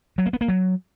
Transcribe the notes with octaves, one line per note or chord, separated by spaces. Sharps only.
F#3
A#3
B3
A#3
F#3